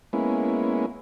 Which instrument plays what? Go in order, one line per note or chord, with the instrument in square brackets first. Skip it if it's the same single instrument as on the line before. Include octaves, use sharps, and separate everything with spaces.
[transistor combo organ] G#3 A#3 B3 C#4 E4